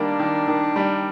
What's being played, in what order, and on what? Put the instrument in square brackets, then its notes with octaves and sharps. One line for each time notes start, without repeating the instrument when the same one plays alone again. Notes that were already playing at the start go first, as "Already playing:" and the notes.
Already playing: [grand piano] D#3 G3 A#3 [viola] D4
[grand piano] D#3
D#3
G3